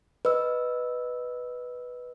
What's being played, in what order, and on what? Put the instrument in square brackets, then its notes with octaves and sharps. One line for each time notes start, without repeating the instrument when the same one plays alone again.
[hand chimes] B4 D#5 E6